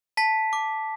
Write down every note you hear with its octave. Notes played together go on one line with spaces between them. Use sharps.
A5 B6
D6